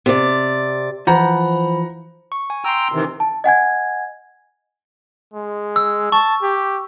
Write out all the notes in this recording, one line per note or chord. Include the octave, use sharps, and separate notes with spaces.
C3 D5
E3 F3 C5 F#5 A#5 B5
C#6
G#5
G5 A#5 C6 E6
C3 D#3 E3
A5
D#5 F#5 G#5 G#6
G#3
E6
A5 C#6
G4